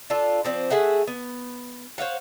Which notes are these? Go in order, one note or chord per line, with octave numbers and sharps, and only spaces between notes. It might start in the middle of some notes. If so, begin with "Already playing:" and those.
D4 F4 A4
F3 C4 D5
A3 G#4 E5 F#5
B3
C5 C#5 F5 F#5